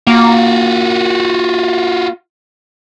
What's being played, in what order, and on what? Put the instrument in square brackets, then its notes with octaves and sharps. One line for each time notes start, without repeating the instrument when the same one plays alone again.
[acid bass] A#3 [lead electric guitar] F4 F#4